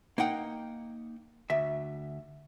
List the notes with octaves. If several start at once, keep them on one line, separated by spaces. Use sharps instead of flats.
A#3 D#4 F#5 G5
D2 E5